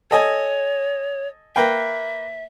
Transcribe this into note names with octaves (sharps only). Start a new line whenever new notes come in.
A4 C#5 D#5 G#5
A#3 B4 E5 G5